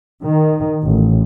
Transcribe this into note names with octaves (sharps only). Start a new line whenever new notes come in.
D#3
A1